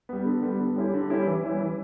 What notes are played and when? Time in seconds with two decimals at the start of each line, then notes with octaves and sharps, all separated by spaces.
0.09 G3 B3
0.25 D3
0.42 G3 B3
0.60 D3
0.76 G3 C#4 E4 G4
0.94 D3
1.10 G3 C#4 E4 G4
1.27 E3
1.43 G3 C#4 E4
1.60 E3